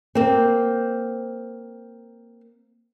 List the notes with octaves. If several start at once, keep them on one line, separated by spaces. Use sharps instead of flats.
A#3 C4